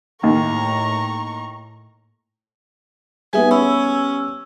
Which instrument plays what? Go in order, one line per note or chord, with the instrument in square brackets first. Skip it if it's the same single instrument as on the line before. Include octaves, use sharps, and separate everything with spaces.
[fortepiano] D#2 [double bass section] A2 [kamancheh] A#5 C#6
[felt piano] G3 B3 [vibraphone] D#4 B4 [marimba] G#4 E5 [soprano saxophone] G#5
[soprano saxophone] C#4 [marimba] B5 [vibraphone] E6